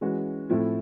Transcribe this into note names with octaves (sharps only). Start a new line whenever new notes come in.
E3 G#3 C#4 F#4
A2 F3 A3 C4 E4